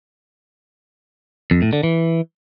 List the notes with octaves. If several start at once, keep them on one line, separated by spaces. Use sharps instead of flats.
F2
A2
D3
E3